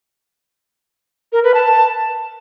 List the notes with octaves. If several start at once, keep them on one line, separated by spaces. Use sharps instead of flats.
A#4
B4
A5